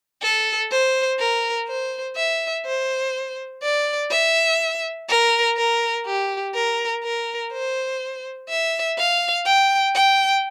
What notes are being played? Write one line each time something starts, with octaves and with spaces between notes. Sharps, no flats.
A4
C5
A#4
C5
E5
C5
D5
E5
A#4
A#4
G4
A#4
A#4
C5
E5
F5
G5
G5